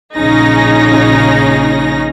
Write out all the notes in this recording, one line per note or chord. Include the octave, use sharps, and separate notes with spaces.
A#1 C#3 C#4 D#4 G#4 A#6